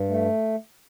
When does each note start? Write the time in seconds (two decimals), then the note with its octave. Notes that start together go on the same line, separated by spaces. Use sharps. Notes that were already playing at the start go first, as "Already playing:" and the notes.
Already playing: G2
0.10 A3